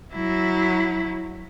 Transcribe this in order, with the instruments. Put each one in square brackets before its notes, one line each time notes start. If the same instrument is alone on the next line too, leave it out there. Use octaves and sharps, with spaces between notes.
[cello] F#3 E4